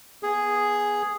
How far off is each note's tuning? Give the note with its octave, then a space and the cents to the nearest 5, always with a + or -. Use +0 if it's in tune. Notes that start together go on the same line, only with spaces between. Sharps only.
B3 -15 G#4 +0